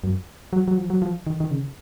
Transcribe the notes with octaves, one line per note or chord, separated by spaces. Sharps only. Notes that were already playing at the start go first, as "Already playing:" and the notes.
F#2
F#3
F#3
F3
F#3
F3
D#3
D#3
C#3